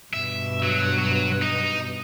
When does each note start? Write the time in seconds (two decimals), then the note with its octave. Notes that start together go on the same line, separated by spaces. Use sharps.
0.13 G2 B2 E5
0.63 F#3
0.98 F#3
1.42 D#4